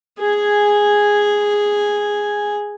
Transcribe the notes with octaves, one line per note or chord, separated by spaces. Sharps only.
G#4 G#5